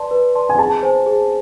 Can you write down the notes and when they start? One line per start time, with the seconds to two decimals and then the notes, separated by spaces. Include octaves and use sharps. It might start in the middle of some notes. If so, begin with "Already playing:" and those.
Already playing: B4 D5 A5 C6
0.11 B4
0.35 D5 A5 C6
0.49 G#5
0.59 G#4 A5
0.83 C5 G#5
1.06 G#4